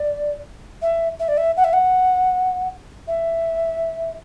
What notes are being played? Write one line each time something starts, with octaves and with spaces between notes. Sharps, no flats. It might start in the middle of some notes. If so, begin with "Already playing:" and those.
Already playing: D5
E5
E5
D5
E5
F#5
E5
F#5
E5